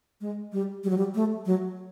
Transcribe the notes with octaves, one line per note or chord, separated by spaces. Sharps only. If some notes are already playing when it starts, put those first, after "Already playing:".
G#3
G3
G3
F#3
G3
A3
F#3